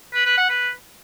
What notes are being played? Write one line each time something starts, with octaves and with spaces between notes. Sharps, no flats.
B4
B4
F#5
B4